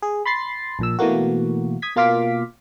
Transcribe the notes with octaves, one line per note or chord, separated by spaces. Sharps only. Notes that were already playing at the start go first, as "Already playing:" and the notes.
G#4
B5 C6 A6 C7
A#1 A#2 E6
B2 E3 A3 A#3 F#4
D#6 G#6 B6
B2 A#3 F4 F5 D6 B6